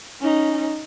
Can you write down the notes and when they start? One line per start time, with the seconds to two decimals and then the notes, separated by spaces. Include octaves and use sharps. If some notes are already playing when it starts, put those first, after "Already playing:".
0.20 C#4 D#4